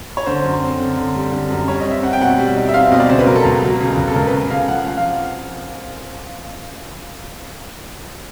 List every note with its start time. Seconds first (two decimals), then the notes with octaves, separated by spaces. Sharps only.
0.17 C#5
0.26 D3 C5
0.44 F#2
0.62 C4
0.79 D3
0.97 D3
1.15 G3
1.32 D3
1.50 F#2
1.68 G3 C#5
1.80 D#5
1.85 C4
1.91 E5
2.03 C4 F#5
2.13 G5
2.21 B2 F#5
2.38 G3
2.56 D#4
2.69 E5
2.73 C4 F5
2.83 E5
2.92 B2 D#5
3.00 D5
3.09 C#3 C5
3.19 B4
3.27 F#3 A#4
3.36 A4
3.45 C#2
3.62 F#3
3.81 C#3
3.97 C#2
4.08 A4
4.16 C#2 A#4
4.27 B4
4.33 C#3
4.50 C#3 F5
4.68 F3 F#5
4.86 F3 F#5
4.97 F5